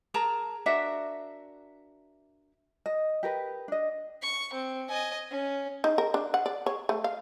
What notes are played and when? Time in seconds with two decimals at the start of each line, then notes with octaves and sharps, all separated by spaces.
0.14 G#4 A#4 A5 A#5
0.66 D4 F#4 A#4 E5
2.86 D#5
3.23 G4 A#4 B4
3.68 D4 D#5
4.22 C#6
4.53 C4
4.88 D#5 G#5
5.30 C#4
5.84 D#4
5.98 A#4
6.14 D4
6.34 F#5
6.46 D5
6.66 C#5
6.89 A3
7.04 F5